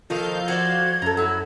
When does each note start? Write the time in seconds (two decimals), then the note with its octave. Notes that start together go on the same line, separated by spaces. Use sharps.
0.10 D#3 F3 A#3 D#4 A4 F5 G6
0.48 F#4 C5 D5 G#6
1.02 F#2 A4 A#5
1.17 E4 F#4 E6